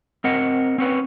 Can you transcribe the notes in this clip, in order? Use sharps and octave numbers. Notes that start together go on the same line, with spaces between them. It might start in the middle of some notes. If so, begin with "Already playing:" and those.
C4 A#4 D#5 F#5
C4 C#4 B4